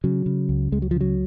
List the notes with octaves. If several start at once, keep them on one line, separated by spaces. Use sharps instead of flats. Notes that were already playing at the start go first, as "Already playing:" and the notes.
C#3 F#3
C#3
C#2
C#2 G#3
F#3
F3
C#3 F#3